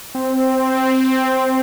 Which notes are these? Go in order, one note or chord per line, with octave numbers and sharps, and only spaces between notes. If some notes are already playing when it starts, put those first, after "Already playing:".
C4